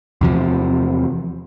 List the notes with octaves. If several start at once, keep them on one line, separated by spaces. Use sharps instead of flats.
E2 C3 F3